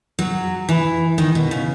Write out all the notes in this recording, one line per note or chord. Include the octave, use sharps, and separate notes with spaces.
F#3
E3
D#3
B2
C#3